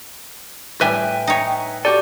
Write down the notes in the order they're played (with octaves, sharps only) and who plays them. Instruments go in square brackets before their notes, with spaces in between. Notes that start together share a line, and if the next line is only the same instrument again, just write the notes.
[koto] A2 G3 [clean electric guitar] B4 E5 G#5 [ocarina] G5
[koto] D#4 C#5
[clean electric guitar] F#4 G4 A4 [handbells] D5